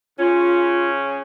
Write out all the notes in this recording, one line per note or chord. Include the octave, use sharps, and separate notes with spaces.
C#3 C#4 F4